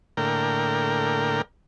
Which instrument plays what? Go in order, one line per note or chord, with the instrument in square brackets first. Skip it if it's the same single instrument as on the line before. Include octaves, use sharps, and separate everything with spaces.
[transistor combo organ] A2 D3 A#3 A#4 G5